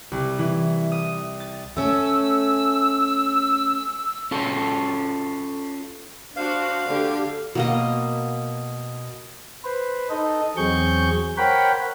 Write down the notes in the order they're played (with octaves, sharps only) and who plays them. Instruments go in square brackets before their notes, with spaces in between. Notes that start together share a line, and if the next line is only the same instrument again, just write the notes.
[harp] C2
E3
D#6
A6
[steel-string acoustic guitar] A3 C#4 [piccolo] E6
[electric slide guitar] C#4 F4 A4
[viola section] D4 F#4 C5 [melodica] F5
[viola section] D3 A3 G4
[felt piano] B2 [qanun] F#3 A#3 D#5
[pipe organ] B4 C5
D#4 A4 D#5
E2 F#3 C4 G#4 C#6 G6
A#4 C5 C#5 F#5 G5 B5